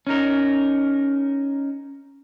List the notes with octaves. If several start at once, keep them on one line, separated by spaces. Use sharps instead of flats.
C#4 D#4 A#4